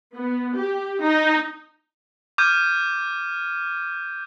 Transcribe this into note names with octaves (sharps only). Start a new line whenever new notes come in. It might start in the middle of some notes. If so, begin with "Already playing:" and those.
B3
G4
D#4
D6 F6 G6 G#6 D#7